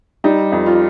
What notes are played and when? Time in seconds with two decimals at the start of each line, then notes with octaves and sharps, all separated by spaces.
0.24 G3 D#4
0.52 F2
0.66 F4